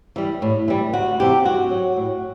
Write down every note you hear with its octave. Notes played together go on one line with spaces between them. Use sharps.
E3 G3
A2
E3 G3
D2 F#4
C3 E3 G3 G4
G2 F#4
F#3
A2